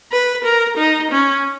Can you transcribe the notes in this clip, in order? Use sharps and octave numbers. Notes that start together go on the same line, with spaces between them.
B4
A#4
D#4
C#4